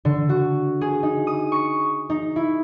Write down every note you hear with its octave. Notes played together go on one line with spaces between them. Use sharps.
D3
F#4
G#4
D#4
D#6
C#6
D#4
E4